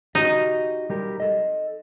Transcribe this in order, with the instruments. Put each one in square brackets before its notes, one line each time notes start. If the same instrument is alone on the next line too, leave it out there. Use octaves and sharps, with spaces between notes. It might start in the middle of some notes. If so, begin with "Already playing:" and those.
[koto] D#4 [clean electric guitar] F#4 G4 D#5
[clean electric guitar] G3 G4 A#4
A4 D#5